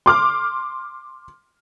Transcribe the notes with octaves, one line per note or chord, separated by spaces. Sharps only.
C6 D6 F6